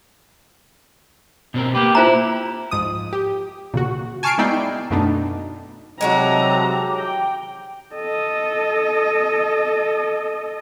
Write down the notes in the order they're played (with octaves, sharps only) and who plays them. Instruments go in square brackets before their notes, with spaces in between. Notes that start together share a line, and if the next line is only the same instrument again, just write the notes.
[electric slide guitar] B2 C4 A#4
[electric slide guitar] A#3 B4 [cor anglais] G4
[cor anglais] E4 [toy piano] F4 C5 A#5
[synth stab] G#2 F3 D#6
G4
A#2 C#3 F#4
G#5 A5 C#6 F6 C7 D7
G#3 B3 D#4 E4 D5 G5
F#2 B2 A3 B3 D4 D#4
[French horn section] C3 F#3 [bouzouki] G#3 D#4 F#4 [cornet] G4 [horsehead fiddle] A4 A#5
[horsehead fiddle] G5
A4 D#5